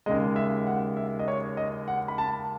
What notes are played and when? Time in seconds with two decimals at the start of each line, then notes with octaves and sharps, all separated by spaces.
0.06 D#2 C#3 G#3 D#5
0.36 E5
0.67 F#5
0.97 E5
1.19 D#5
1.28 C#5
1.57 D#5
1.88 F#5
2.08 B5
2.18 A5